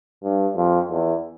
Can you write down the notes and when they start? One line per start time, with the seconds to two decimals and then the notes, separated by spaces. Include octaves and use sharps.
0.23 G2
0.56 F2
0.90 E2